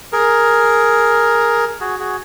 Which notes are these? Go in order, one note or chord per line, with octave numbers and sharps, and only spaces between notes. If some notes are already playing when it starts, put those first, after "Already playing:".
G#4 A#4
F#4 G#4
F#4 G#4